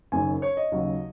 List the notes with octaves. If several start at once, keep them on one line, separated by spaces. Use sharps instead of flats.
F#1 F#2 D#3 G#5
C#5
D#5
D#2 C#3 F#3